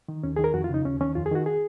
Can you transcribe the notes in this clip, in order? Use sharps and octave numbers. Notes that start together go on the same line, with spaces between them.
D#3
D#2 C#4
D#3 G#4
A#4
F2 F#4
F4
C#3 D#4
D#2 C#4
D#3 C#4
F2 F4
G#4
D#3 F#4
G#4